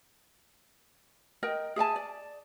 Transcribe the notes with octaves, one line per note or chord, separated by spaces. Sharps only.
A#4 D#5 G5
G#4 E5 G#5 A5
D5